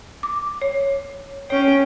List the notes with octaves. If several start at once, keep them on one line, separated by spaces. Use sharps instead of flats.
D6
C#5
C#4 C#5 G5